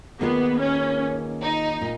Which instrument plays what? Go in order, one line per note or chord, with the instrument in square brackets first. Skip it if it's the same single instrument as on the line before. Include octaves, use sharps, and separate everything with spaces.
[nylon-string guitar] D#3 A#3 F4 G#4 B4 [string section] B3
[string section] C#4
D#4
[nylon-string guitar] A#2